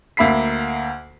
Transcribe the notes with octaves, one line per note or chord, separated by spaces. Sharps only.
D2 A#3 E5 B5 B6 C7